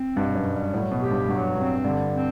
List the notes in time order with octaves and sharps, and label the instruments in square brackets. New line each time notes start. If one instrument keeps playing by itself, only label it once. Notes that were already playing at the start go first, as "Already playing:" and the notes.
Already playing: [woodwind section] C4
[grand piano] G2 [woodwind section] B2
[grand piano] F#2
[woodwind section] G3
[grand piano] A2 [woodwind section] F#3
[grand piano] B2
[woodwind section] G4
[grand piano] G2
[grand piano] G2 [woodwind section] F#3
[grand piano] G2 [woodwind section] C4
[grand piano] G2 [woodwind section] D3
[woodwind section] C4